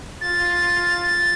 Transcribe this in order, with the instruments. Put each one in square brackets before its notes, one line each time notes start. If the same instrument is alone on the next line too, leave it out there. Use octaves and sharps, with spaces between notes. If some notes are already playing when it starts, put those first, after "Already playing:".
[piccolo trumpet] F4 [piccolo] A6